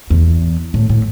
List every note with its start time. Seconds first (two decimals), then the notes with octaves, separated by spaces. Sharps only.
0.10 E2
0.74 A2
0.90 A2